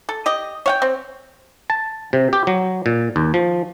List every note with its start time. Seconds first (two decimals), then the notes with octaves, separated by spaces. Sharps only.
0.09 A4
0.26 G4 D#5
0.66 C#5 F#5 G5
0.82 C4
1.70 A5
2.13 C3
2.33 G4
2.47 F#3
2.86 A#2
3.16 D#2
3.34 F3